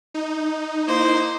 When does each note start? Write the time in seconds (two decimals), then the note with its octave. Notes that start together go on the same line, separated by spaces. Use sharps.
0.14 D#4
0.87 A#3 E4 C5